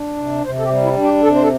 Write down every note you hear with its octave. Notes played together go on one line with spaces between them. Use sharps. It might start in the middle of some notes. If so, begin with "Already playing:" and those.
Already playing: D4
C3
C3 C5
A4
G4
G3
E4
D4
G4
C3 A4
C5
A4